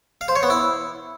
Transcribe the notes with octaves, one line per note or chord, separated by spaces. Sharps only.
F5
C5
C#5
B3
E4